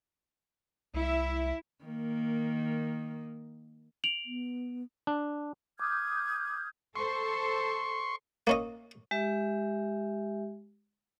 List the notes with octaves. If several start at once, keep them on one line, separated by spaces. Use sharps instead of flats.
C2 E4 E5
D#3 A#3
D7 F7 F#7
B3
D4
D6 D#6 F6 G6 G#6
A4 C5 C6 C#6
A#3 C#4 D#5
G#3 G4 E5